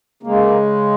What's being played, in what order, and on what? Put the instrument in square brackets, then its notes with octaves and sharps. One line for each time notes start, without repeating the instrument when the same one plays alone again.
[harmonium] C#3 G#3 A#3